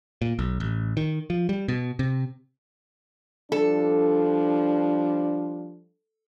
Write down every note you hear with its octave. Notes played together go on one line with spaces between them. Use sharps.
A#2
B1
A1
D#3
F3
G3
B2
C3
F3 G3 D4 A4